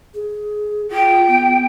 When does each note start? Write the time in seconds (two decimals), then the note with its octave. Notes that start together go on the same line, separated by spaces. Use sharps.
0.14 G#4
0.91 F4 G5
1.28 B3